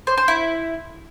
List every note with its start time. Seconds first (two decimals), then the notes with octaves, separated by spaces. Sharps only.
0.07 C5
0.18 C5
0.28 E4